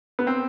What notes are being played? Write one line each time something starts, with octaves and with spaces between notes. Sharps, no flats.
B3
C4